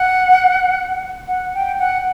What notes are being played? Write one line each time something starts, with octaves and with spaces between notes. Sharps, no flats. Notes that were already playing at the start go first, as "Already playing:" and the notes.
Already playing: F#5
F#5
G5
F#5